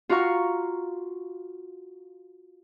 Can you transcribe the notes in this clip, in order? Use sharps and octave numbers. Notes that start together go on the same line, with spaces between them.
F4 F#4 F5 A#5 C#6